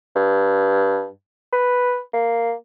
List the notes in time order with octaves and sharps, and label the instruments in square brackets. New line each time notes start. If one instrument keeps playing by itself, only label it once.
[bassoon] G2
B4
A#3